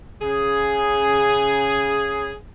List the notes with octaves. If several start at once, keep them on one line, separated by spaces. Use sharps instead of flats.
C#3 G#4